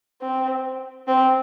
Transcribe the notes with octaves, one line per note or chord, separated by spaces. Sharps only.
C4
C4